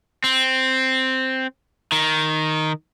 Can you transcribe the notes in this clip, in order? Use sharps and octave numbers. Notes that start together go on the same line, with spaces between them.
C4
D#3